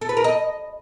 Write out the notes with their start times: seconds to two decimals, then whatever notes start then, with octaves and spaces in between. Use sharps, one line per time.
0.01 A4
0.09 B4
0.17 A#4
0.24 D#5